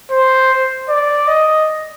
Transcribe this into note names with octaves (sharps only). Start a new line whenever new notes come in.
C5
D5
D#5